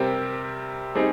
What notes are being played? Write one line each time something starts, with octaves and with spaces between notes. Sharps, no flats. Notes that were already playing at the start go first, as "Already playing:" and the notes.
Already playing: C3 G3 C4 G4 A#4
G3 C4 D#4 G#4